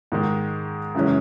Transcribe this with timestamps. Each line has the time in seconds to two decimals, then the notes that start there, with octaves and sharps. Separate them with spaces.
0.12 G#2 D#3 G#3
0.95 F#2 C#3 E3 G#3 C#4